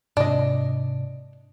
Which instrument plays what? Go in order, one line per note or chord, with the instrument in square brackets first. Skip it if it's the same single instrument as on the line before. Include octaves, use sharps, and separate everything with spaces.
[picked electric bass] G#2 C3 [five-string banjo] D4 D#5